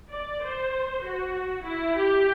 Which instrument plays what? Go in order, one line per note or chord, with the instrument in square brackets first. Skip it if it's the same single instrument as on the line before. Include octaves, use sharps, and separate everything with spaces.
[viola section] D5
C5
F#4
E4
G4